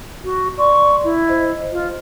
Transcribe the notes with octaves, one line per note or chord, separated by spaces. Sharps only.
F#4
D5 C6 C#6
E4
C5 D#5
F4